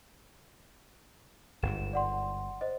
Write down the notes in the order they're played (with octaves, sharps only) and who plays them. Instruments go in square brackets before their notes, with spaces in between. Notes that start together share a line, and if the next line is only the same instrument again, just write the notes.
[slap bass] G1 G#2 [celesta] E7
[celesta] D5 F#5 C6
C5 D#5